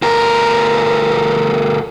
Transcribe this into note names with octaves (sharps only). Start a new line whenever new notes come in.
D2 A#4